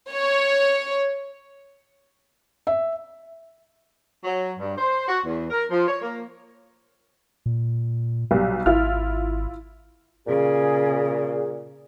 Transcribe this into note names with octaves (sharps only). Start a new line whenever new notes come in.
C#5
E5
F#3
G2
C5
F#4
E2
A#4
F3
C#5
A#3
A#2
B1 G3
G#1 E4 F4 F6
A#2 C#3 G#4